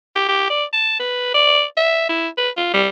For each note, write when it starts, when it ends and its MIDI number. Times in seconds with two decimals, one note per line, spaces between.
0.15 0.24 67
0.28 0.46 67
0.50 0.64 74
0.73 0.97 81
0.99 1.33 71
1.34 1.63 74
1.77 2.05 76
2.09 2.28 64
2.37 2.49 71
2.57 2.69 65
2.74 2.88 55